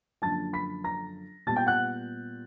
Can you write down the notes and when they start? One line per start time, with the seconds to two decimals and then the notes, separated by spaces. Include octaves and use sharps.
0.22 F#2 D3 F3 A#3 D4 A5 A6
0.53 B5 B6
0.84 A#5 A#6
1.47 A#2 G3 B3 A5 A6
1.56 G5 G6
1.66 F#5 F#6